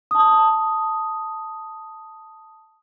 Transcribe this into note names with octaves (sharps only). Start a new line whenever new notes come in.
A5 D#6